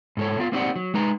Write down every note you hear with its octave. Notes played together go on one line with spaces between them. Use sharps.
G#2 A4 C#5
B3 F4 F5
A#3 C4 D#4 G4 D5 F#5
F#3
G#3 D#4 B4 A#5